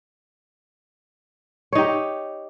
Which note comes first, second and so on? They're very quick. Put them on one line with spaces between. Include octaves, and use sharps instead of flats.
C#5 D#4 G4